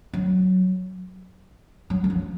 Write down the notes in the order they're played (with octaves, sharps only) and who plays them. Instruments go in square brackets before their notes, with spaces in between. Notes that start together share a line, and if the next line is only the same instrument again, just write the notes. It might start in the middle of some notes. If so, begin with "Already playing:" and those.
[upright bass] F#3
F#3
D#3
F3